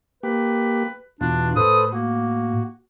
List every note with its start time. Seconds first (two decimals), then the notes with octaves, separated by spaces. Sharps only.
0.23 A#3 G4 B4
1.21 E2 B2 D4 F4
1.56 A2 A4 B4 C5 D#6
1.92 A#3 F#4